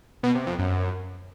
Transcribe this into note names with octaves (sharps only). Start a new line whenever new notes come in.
B2
C3
F2
F#2